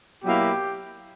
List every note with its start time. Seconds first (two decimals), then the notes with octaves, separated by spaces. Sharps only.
0.24 B2 F#3 A#3 E4 G4